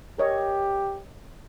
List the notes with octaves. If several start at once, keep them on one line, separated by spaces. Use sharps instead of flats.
G4 A#4 C#5 D#5